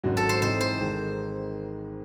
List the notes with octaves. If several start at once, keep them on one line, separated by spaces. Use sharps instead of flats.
G#1 G#2 F#3 C#4 F#4
A4
C5
G#2 E3 C4 D#4 C5
C5
G#1 G#2 D#3 G#3